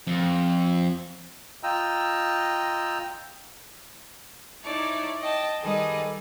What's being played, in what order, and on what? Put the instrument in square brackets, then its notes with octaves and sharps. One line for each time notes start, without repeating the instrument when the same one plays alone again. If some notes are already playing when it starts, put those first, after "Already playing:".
[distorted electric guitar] F2
[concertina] F4 D#5 G5 A#5 E6
[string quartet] D#4 E4 C#5 D5 A5
D#5 G5 A5
D#3 G3 G#4 A4 B4 D#5